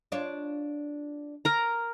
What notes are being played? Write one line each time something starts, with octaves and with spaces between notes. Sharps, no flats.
D4 F4 C#5
A#4 A#5